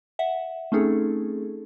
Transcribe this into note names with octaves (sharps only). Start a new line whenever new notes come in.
E5 F#5
A3 C4 C#4 D#4 G#4 A4